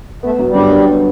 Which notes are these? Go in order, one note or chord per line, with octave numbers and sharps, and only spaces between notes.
A3 B3
F#3
G3
G1
G2
B3